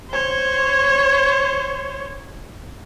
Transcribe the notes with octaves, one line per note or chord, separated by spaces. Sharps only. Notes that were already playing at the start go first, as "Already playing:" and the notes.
C5 C#5